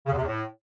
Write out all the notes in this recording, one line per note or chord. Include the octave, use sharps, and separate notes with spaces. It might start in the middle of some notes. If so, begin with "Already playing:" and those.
C#3
E2
C3
E2
A2